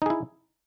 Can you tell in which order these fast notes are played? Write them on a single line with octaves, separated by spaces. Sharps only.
D#4 G#4 E4